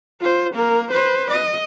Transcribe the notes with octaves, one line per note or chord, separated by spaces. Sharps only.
F4 C5
A#3 A#4
B4 C5
D#5